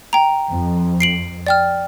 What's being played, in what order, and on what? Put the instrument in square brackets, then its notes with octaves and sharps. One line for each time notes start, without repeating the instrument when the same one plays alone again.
[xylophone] G5 A#5
[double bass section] F2
[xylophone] C7 D7 F#7
D5 G5 F6